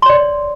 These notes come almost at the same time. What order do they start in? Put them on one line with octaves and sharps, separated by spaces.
C6 C#5 D5